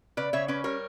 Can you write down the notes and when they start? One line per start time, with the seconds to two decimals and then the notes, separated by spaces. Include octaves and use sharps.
0.17 C#3 B4 D5
0.33 C#3 C#5 E5
0.48 C#4 B4 D5
0.64 G3 A#4 C#5